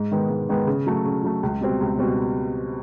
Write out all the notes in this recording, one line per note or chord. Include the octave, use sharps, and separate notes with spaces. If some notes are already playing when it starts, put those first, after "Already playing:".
Already playing: G#2
D#3 G#3 B3
G#2
D#3 G#3 B3
C#3
F#3 A3
C#3
F#3 A3
C#2
B2 G3 C4
C#2
B2 G3 C4